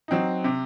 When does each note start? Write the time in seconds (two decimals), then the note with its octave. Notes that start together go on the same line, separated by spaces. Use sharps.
0.08 F#3 C4 D#4
0.44 C3